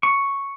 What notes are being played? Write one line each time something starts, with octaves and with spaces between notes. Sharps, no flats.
C#6